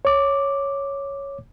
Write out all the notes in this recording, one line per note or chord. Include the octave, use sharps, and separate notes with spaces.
C#5 D6